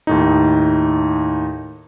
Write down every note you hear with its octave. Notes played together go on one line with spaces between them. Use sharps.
D#2 A2 D#4